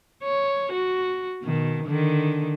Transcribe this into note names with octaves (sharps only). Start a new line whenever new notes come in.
C#5
F#4
B2 D#3
D3 D#3